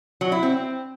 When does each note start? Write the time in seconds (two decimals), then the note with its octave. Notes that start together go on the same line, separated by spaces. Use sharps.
0.21 F#3
0.32 E4
0.43 C4